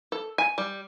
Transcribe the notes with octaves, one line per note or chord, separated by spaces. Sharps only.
A4
G#5
G3